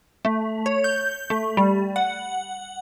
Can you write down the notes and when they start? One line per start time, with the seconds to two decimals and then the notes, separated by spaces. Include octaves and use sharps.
0.25 A3
0.66 C#5
0.84 G6
1.30 A3
1.57 G3
1.96 F#5